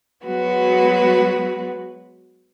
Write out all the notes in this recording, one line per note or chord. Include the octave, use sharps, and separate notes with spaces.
F#3 G#3 B3 F#4 B4